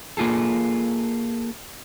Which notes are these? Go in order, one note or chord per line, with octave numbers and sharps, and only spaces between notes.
A#3 F4 G#4 A4